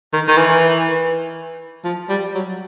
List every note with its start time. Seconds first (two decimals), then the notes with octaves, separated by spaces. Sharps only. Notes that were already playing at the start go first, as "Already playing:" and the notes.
0.13 D#3
0.28 D#3
0.37 E3
1.84 F3
2.09 G3
2.34 F#3